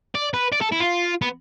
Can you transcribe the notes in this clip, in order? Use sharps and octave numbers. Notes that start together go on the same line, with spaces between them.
D5
B4
D5
A4
E4
F4
B3